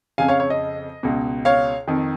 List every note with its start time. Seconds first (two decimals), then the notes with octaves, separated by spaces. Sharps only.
0.18 F2 C#3 F5 G#5
0.28 C#5 F5
0.40 C#5
0.50 D#5
1.03 C#2 B2
1.45 C#5 F5
1.88 F2 D#3